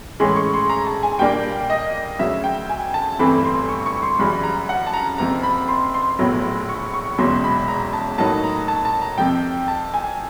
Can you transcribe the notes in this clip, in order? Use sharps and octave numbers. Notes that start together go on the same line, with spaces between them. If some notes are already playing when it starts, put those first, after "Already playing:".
A2 E3 G#3 C#4 C6
C#6
C6
A#5
A5
G#5
A#2 G3 A#3 D4 G5
D#5
D2 C#3 F#3 E5
G5
G#5
A5
G1 G2 E3 A3 C4 B5
C6
C#6
C#6
C6
F#2 C#3 E3 G3 B5
A#5
F#5
A5
A#5
F#1 F2 C3 A#5
B5
C6
C6
A#1 A2 F#3 B3
C#6
C#6
E1 E2 C#3 F#3 C6
B5
A#5
A5
A2 F#3 A#3 D#4 A5
A#5
A5
A5
A#5
F2 C3 F3 G5
A5
G#5